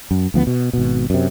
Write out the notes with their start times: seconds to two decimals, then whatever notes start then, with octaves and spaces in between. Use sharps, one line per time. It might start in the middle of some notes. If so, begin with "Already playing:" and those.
0.11 F#2
0.34 D2 F3 A#3 B3
0.47 B2
0.73 G#1 B2
1.10 F#2 C3